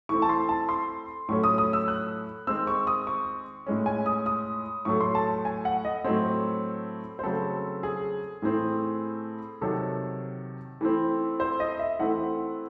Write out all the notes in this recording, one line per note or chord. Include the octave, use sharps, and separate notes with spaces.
E3 A3 C4 C#6
A5
C6
A5
C6
A2 F#3 A3 C#4 C#6
D#6
D#6
E6
F#6
D#3 G#3 C4 E6
C#6
D#6
C#6
A2 G#3 C#4
G#5
D#6
D#6
A2 F#3 A3 C#6
C6
A5
G#5
F#5
D#5
A2 F#3 A3 C4 C#5
C5
C#3 F#3 A3 C4 A4
G#4
A2 E3 A3 C4
C3 D#3 F#3 A4
E3 A3 C4
C5
D#5
E5
E3 A3 C4 F#5